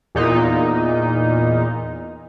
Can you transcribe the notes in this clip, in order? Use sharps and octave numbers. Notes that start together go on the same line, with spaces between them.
E2 A#2 D#4